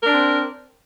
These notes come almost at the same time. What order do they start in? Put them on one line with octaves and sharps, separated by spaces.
A#4 D4 C4